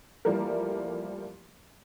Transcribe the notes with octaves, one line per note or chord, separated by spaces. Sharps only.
E3 F3 G3 A3 A#3 A#4